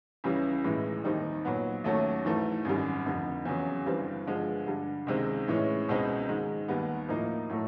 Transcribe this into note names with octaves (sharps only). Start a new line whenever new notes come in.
C#2 C#3 E3 G3
B1 A2 E3 G#3
D#2 D#3 G3 C4 D#4
A#2 F#3 B3
D#2 D#3 F#3 A3 C#4
G#2 E3 A3
G#1 F#2 D#3 G3
F1 F2 D3
E2 C#3 F#3
G1 G2 E3 G3 C4
G1 G2 D3 F3 G#3
G2 D3 G3
C#2 C3 D#3 G#3 C4
A2 E3 G#3 C#4
C#2 B2 G#3 C4 D#4
G#2 D#3 G#3
D#2 D#3 G3 B3
A2 F3 A#3 D#4
A2 F#3 A3